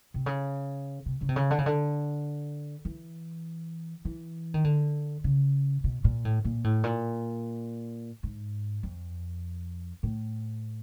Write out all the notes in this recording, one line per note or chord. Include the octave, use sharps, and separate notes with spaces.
C3
C#3
C3
C#3
C3
C#3
D3
C#3
D3
E3
E3
D#3
D3
C#3
B2
A#2
A2
A#2
A2
A#2
G#2
F2
A2